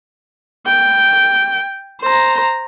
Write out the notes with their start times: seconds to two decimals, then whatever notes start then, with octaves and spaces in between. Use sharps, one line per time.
0.66 G5
2.02 C5 A#5